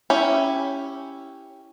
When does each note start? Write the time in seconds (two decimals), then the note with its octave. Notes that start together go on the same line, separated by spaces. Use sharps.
0.10 C#4 E4 G4